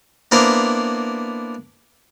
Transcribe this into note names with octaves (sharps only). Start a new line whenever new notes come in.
A#3 B3 D4 E4 A#4 C5